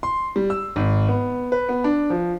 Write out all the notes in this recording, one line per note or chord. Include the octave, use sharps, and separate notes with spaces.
C6
G3
E6
G#1
B3
B4
B3
D4
F3